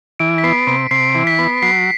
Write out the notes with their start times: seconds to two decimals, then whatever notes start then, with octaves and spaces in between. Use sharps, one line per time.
0.19 E3 D7
0.38 B6
0.44 B3 C7
0.67 C3 D7
0.91 C3 C7
1.15 E3
1.27 B6
1.39 B3
1.62 F#3 C7